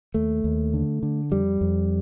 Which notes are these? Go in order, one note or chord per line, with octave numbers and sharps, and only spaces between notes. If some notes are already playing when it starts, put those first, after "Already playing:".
D#2 A3
D#2
D3
D3
F2 G3
F2